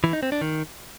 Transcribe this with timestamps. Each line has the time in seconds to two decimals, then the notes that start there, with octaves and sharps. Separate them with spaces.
0.04 E3
0.13 D#4
0.23 C4
0.32 D4
0.41 D#3